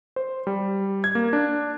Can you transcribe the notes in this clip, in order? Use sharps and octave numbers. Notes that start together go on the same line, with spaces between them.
C5
G3
G#6
A#3
D4